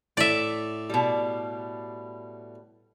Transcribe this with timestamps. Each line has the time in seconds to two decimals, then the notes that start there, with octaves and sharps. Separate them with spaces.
0.17 A2 D5 E5
0.90 B2 G3